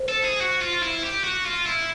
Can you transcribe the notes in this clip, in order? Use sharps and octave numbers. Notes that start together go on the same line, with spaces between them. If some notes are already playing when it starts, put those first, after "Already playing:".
Already playing: C5
A4
G#4
F#4
F4
E4
G4
F#4
F4
E4